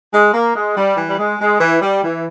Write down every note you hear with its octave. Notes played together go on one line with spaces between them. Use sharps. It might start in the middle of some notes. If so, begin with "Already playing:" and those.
G#3
A#3
G#3
G3
E3
G3
G#3
G#3
E3
G3
E3